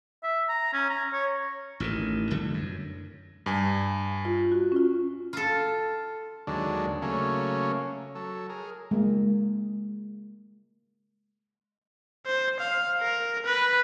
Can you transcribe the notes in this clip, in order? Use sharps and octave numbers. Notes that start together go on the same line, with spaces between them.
E5
A#5
C#4
A#5
C#5
A1 A2 C3 D#3
C2 D3 E3 A3
F#2
G2 G#5
F4
F#4
C#4 F4
F4 A4
D#2 D3 F#3 G#3 D4
C#3 F#3 A3 A#3 C#4
F#3 A4
G#4 A#4
G#3 A#3
C5
F5
A#4
B4